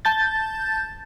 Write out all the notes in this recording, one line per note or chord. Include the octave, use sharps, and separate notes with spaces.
A5 G6 A6